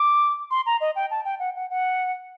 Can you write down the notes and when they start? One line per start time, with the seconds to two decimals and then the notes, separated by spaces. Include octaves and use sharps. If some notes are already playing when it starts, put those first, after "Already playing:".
Already playing: D6
0.51 C6
0.66 A#5
0.81 D#5
0.96 G5
1.11 A5
1.25 G5
1.40 F#5
1.56 F#5
1.70 F#5